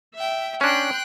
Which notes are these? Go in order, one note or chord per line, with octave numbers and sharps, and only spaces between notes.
E5 G5
C#4 D4 G5 C6 F#6